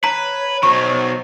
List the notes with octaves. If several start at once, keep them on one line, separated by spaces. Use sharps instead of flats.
B4 C#5 A#5
B1 F#3 C5 C#6